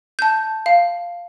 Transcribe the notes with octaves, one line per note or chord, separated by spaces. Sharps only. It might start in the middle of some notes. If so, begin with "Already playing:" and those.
A5 G6
F5